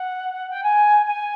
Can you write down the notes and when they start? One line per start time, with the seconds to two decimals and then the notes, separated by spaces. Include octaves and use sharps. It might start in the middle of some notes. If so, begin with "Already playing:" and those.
Already playing: F#5
0.49 G5
0.63 G#5
1.06 G#5